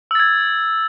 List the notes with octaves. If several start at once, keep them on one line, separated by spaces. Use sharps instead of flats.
E6 G#6 A6